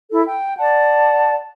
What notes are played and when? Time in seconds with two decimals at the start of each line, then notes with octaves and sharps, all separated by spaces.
0.11 E4 A4
0.24 G5
0.59 D5 F#5 A5